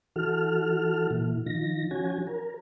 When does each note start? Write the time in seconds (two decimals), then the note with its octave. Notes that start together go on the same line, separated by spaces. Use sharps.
0.16 E3 F#4 A4 F6
1.11 A#2 E3
1.46 D#3 F3 A#6
1.91 F3 C#4 F#4 G#5
2.27 A#4